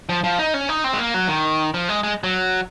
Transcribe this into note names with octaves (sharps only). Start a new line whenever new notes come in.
F3
F3
D#4
C#4
D#4
C4
G#3
A#3
F#3
D#3
F3
G#3
G#3
F#3